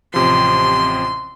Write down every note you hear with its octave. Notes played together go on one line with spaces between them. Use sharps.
A1 C3 F3 C6